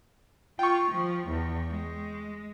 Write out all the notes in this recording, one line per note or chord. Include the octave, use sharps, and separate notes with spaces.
F4 G5 C#6
F3
E2
G#3